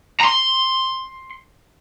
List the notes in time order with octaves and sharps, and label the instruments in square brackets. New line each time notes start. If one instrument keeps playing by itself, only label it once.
[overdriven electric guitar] A#5 C6